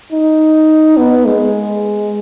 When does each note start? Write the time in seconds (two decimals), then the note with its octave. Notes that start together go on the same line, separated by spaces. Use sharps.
0.12 D#4
0.97 B3
1.25 G#3